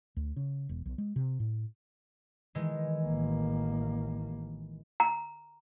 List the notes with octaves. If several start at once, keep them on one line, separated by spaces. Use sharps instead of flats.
D2
C#3
E1
B1
G#3
C3
A2
D#3 E3 G#3
A1 A#3
A#5